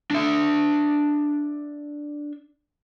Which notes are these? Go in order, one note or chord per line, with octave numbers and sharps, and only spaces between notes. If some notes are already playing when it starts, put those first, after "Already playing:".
D4 E5